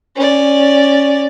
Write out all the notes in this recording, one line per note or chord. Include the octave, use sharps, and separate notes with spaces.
C#4 D5